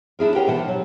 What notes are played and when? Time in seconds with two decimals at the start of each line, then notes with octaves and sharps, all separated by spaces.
0.19 D4 E4 G#4 A#4
0.35 G4 A#4 B4 C#5 F#5 G5
0.47 B2 E3 C5 F#5 A5
0.68 F#3